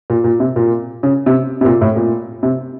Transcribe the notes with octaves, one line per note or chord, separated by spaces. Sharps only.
A#2
A#2
C3
A#2
C#3
C3
C3
A#2
A2
A#2
C3